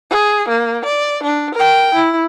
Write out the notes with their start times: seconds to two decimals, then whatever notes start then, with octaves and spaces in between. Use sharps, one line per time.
0.11 G#4
0.49 A#3
0.85 D5
1.23 D4
1.55 A#4 G5
1.95 E4